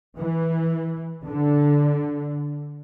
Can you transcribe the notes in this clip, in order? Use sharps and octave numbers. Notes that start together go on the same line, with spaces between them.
E3
D3